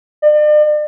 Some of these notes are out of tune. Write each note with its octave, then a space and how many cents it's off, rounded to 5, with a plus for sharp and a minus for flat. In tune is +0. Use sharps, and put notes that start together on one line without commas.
D5 +40